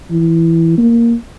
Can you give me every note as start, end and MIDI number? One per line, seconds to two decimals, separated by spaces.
0.11 0.74 52
0.78 1.15 58